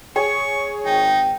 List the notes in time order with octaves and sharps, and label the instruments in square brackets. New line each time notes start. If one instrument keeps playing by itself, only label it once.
[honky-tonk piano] G#4 C#5 [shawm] C#6
[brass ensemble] G#1 G5 [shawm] D#4